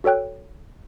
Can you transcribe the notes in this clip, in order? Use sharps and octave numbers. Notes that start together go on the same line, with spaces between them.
F#4 A4 C#5 G5 F#6